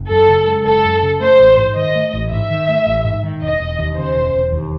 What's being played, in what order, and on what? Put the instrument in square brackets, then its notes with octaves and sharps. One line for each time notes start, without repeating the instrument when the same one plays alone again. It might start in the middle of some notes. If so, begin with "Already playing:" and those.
Already playing: [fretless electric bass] F#1
[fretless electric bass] F#2 [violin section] A4
[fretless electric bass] C#3
G#3
[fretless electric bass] F#1 [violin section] A4
[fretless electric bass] F#2
C#3
[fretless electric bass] A3 [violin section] C5
[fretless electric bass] A1
G#2
[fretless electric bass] D#3 [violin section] D#5
[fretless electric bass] A3
A1
[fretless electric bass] G#2 [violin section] E5
[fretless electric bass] D#3
A3
A1
G#2
D#3
[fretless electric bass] E1 [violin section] D#5
[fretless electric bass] E1
D#2
[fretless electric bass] C#3 [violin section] C5
[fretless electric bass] E1
E1
D#2